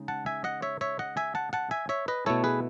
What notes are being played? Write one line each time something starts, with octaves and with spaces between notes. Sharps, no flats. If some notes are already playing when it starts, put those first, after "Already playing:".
Already playing: C#3 G#3 D#4
F#5 A5
E5 G#5
D#5 F#5
C#5 E5
C#5 E5
D#5 F#5
E5 G#5
F#5 A5
F#5 A5
E5 G#5
C#5 E5
B4 D#5
B2 A3 E4 A4 C#5
G#4 B4